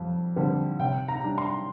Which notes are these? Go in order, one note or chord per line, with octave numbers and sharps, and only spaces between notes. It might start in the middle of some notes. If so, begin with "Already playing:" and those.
Already playing: F2 G3
D3 G3 C4
C3 G5
A#5
G3 D4
C6